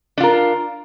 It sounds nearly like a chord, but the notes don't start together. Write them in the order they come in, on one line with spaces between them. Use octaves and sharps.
D4 F4 A#4